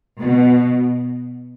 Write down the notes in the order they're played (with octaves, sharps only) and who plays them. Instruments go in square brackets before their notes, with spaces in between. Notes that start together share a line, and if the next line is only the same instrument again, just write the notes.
[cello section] B2